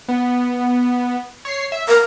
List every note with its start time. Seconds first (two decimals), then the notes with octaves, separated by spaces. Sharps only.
0.08 B3
1.45 C#5 C7
1.72 E5
1.88 A#4 A#5